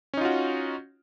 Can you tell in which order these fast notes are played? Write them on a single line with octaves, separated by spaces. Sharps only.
C#4 D#4 F4 F#4